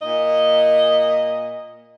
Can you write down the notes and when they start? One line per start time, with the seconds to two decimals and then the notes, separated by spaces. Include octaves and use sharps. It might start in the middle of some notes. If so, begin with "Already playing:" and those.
0.02 A#2 D#5